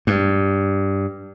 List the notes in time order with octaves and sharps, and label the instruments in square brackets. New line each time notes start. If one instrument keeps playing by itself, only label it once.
[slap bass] G2